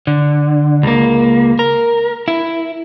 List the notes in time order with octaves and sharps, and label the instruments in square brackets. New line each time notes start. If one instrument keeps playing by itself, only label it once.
[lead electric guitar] D3
C#2 A#3
A#4
E4